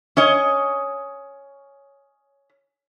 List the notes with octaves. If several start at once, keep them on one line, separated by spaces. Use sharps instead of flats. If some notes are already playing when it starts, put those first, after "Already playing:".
C#4 C#5 D#5